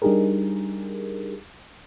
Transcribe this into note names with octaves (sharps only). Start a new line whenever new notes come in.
G3 D4 D#4 G4 G#4 A#4